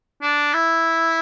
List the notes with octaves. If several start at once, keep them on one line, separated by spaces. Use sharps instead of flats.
D4
E4